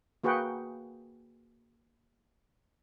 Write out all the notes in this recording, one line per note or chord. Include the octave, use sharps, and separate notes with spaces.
A#3 F#4 G#4 B4 F#5 G5